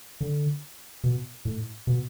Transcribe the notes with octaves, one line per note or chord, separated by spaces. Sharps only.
D3
B2
A2
B2